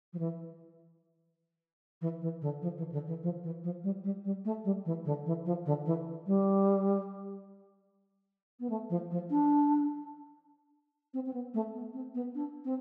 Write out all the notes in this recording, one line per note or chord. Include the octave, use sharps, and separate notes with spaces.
F3
E3
E3
E3
D3
F3
E3
D3
E3
F3
E3
F3
G3
G3
G3
A3
G3
E3
D3
E3
F3
D3
E3
G3
B3
A3
F3
F3
D4
C4
C4
B3
A3
B3
C4
B3
D4
C4